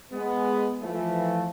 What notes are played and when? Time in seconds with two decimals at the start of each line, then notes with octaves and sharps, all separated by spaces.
0.13 G#3 B3
0.82 E3 F3 A3